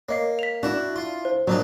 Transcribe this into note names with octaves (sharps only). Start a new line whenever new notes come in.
A#3 C#5 D#5 C7
B6 F7
D4 E4 F#4
F4
C5
A#2 F#3 D4 D#4